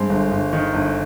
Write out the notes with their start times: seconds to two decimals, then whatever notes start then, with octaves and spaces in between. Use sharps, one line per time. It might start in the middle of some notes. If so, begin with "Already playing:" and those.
Already playing: G2 G#3 C4
0.09 G1
0.31 G1
0.53 D#3
0.74 G1